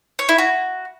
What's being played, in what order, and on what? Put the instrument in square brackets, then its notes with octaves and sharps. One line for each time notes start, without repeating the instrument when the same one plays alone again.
[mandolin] C#5
E4
F#4